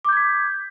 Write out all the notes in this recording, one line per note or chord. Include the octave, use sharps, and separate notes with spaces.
D6 G6 G#6 B6